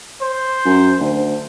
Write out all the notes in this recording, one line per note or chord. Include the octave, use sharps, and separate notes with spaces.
C5
F#2
D2